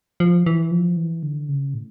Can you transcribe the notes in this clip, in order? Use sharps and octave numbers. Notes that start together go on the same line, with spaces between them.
F3
E3
F3
E3
D3
C#3
A2